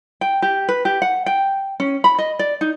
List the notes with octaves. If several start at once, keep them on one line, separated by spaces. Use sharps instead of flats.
G5
G4
B4
G4
F#5
G5
C#4
B5
D#5
D5
D#4